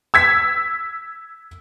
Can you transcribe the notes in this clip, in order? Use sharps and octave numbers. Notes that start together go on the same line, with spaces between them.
E6 G#6 B6